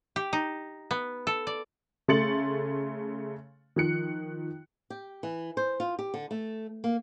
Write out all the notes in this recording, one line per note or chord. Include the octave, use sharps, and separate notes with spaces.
G4
D#4
B3
A4
D5
C#3 A3 C6 A6 C#7 F#7
D#3 F3 F#6 C#7
G4
E3
C5
F4
G4
D3
A3
A#3